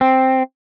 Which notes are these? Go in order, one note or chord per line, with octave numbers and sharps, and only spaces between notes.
C4